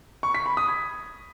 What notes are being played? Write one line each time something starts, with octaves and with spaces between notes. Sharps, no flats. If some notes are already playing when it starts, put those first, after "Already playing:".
C#6
B6
B5
D#6
G#6